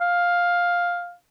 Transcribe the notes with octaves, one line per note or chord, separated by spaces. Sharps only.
F5